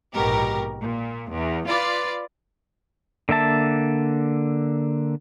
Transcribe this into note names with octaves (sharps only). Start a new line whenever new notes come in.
A#1 G#2 B2 G4 A#4
A#2
E2
F4 B4 D5
D3 A#3 E5 A5